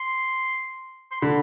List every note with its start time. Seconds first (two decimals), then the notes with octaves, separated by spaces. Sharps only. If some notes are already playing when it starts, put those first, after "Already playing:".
Already playing: C6
1.11 C6
1.21 D3 B5